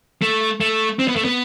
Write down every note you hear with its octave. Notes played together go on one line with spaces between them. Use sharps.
A3
A3
C4
B3
A3
B3